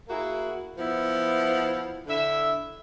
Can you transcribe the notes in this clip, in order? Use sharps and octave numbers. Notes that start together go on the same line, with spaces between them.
A#3 E4 F#4 G#4
F3 B3 E4
D3 E4 E5